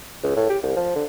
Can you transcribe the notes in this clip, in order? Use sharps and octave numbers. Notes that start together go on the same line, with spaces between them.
C#2
A2
G4
C2
F3
D3